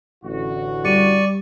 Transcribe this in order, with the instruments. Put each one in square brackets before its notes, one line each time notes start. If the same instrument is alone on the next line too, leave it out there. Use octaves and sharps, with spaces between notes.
[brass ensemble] A1 D3 F#4
[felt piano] G3 [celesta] G4 C#7 D#7 [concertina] D5 C#6